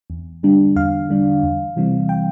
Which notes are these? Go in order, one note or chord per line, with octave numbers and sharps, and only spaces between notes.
E2
D3 G3 D4
E2 F5
D3 G3 D4
E2
C3 E3 G3 C4
G5